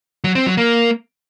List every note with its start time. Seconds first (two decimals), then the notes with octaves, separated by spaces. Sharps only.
0.24 F#3
0.35 C4
0.46 F#3
0.57 A#3